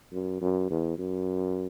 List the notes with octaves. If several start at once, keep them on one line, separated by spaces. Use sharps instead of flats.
F#2
F#2
E2
F#2